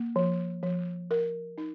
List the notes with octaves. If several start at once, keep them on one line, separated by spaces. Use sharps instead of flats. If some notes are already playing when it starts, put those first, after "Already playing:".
Already playing: A#3
F3
F3
A#4
D#4